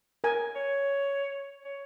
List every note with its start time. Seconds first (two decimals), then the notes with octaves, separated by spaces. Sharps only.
0.24 A#4 G#5
0.56 C#5
1.64 C#5